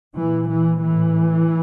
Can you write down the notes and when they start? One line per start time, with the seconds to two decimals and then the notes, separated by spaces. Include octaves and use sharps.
0.14 A#2 E3
0.49 E3
0.82 A2 E3